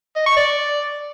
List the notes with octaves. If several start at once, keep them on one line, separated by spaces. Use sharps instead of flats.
D#5
C#6
D5